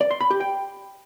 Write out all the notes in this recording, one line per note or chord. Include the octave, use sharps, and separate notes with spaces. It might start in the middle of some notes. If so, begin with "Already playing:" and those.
D5
C6
B5
G4
G5